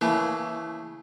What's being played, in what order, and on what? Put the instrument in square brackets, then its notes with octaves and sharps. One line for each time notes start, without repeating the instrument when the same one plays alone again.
[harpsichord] C#3 E3 A3 [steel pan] A#3 B4 [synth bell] E4